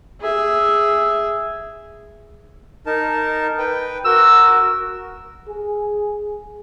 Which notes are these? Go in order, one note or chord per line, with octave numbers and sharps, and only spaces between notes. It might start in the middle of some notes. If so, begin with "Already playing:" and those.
G#4 E5
D#4 A#4 A5
B4 G5
F#4 A#4 E6
G#4